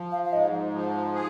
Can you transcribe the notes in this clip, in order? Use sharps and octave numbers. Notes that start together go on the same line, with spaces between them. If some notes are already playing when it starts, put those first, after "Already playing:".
Already playing: F3
F5
F5
G#2 D#5
F3
G#4